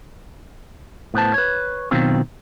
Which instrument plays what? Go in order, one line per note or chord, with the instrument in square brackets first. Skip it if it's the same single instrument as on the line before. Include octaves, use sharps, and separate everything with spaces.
[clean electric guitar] A2 B3 C5 A5
B4 C#5
B2 D#3 F#3 C4 F4